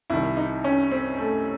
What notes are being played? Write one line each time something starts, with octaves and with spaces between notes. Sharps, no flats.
C2 C3 D#3 E4
D#4
C#4
C4
A3